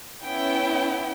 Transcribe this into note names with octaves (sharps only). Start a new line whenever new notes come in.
B3 C#4 E4 G5